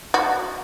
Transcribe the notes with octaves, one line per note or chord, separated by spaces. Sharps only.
F#4